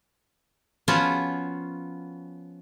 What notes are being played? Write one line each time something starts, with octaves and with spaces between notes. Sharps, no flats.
F3 B3 C#4 F4 F#4